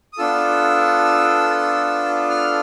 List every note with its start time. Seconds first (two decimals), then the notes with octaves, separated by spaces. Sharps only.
0.13 D#6
0.18 B3 D4 F4 A4 E6
2.30 F6